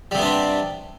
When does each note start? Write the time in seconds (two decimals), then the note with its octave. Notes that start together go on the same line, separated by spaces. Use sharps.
0.11 G3
0.15 C3
0.18 B3
0.22 D4
0.25 C4